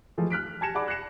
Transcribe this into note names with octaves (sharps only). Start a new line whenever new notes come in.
E3 F3 G#3 A3
F6 F#6 B6 D7
G#5 A5 G#6 A#6 C#7 E7
G#4 D5 F#5 B5 D6
F#6 A#6 C7 C#7 E7